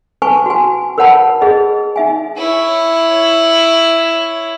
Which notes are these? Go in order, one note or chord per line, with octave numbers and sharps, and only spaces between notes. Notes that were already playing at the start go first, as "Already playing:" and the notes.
B4 G#5 A5 C#6
F#4 G#5
A#4 B4 C#5 F#5 A5 B5
G#4 B4 D#5
D#4 E5 G#5
E4 C#5